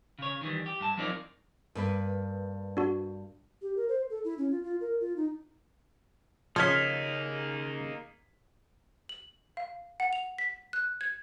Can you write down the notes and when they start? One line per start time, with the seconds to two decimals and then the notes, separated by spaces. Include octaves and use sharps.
0.19 C#3 C#5
0.41 D#3 E3 G3
0.66 G4
0.80 G2 A5
0.97 F3 F#3 C4 D#4 A#4 D5
1.75 G2 A#3 B4
2.77 D4 F#4
3.62 G4
3.77 A#4
3.89 C5
4.10 A4
4.24 E4
4.38 C#4
4.51 F4
4.63 F4
4.81 A#4
5.01 F4
5.16 D#4
6.56 C#3 F3 A#3 C#4 D#4 F6 G#6 B6
9.09 F#7
9.57 F5
10.00 F#5
10.13 F7
10.38 B6
10.73 F#6
11.01 G#6